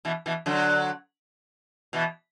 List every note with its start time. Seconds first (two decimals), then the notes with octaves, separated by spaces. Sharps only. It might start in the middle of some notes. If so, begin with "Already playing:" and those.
0.05 B2 E3
0.26 B2 E3
0.46 D3 F#3
1.93 B2 E3